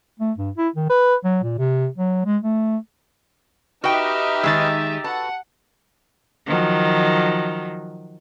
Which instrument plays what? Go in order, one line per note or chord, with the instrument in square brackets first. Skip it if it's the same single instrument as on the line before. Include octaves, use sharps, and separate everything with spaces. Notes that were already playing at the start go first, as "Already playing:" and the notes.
[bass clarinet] A3
G2
E4
D#3
B4
F#3
A#2
C3
F#3
G#3
A3
[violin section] D#4 G4 E5 [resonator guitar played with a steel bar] F#4 G5 [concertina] B4 D#5 F6
[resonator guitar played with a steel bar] D#3 G#3 [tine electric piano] E6 A6
[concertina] F#4 A4 B4 [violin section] F#5 [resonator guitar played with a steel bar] A5
[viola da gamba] D#3 F3 F#3